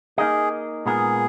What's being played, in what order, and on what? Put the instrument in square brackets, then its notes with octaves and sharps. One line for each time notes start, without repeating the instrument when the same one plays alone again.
[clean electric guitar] A#3 D#4 A#4 D#5 [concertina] G#4
[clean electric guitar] A#2 G#3 B3 F4 A#4 [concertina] G#4